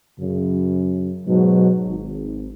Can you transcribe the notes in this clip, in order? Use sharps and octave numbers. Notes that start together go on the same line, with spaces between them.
F#2 C#3
G#2 B2 F#3
G#1